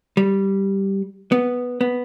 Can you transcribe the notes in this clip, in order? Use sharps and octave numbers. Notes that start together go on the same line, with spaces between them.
G3
B3
B3